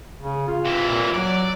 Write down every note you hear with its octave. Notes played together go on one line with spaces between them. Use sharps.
C#3
F4
C3 E3
A#2
F#3 D5